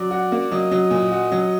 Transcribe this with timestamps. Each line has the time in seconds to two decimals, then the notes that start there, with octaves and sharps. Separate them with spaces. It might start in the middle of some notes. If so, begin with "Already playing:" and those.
Already playing: F#3 D5
0.11 F#4
0.32 A#3
0.51 F#3 D#5
0.71 F#3
0.90 A#2
1.11 F#4
1.32 F#3